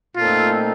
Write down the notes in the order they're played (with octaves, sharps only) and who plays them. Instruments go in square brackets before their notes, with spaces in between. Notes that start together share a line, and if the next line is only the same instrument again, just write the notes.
[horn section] A#2 A3 C4 D#4 A4 [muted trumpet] F4